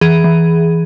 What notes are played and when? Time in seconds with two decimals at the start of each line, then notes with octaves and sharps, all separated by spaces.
0.01 E3 G#4
0.24 E3